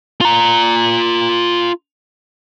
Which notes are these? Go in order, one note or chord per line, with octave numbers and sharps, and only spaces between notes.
F4 A#5